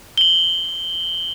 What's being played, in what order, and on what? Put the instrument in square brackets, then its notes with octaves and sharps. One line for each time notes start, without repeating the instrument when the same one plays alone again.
[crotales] F#7 G7